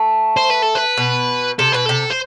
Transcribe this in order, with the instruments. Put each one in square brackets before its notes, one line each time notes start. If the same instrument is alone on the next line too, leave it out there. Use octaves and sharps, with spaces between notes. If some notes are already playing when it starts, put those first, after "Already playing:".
Already playing: [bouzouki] A3
[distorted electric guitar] C5
B4
A4
B4
[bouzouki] B2
[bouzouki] C3 [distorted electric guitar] A4
[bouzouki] B2 [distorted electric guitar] B4
[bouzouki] C3 [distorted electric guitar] A4
[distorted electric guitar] C5